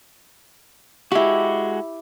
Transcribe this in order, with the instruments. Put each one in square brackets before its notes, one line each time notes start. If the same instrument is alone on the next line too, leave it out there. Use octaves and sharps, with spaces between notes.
[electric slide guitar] G#3 F#4 [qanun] E4 G4